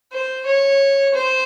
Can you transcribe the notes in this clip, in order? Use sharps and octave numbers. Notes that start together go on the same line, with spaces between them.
C5
C#5
C5